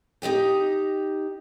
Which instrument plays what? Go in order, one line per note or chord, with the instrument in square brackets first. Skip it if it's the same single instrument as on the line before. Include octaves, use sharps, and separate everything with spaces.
[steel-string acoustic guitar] D#4 G4 D#5 G5